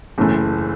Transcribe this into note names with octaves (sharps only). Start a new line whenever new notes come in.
F#1 F#2 E3 A3